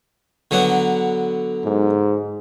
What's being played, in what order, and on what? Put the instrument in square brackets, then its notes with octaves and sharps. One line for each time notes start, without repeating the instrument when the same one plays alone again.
[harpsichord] D3 F#3 B3
[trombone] G#2